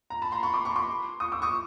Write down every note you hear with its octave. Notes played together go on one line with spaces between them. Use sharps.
A#5
A5 B5
A#5 C6
B5 C#6
C6 D6
B5 C#6
C6 D6
C#6 D#6
D6 E6
C#6 D#6